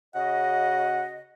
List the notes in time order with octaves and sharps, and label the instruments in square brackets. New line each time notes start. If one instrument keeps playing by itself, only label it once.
[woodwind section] C#3 F#4 D#5 [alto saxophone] F#5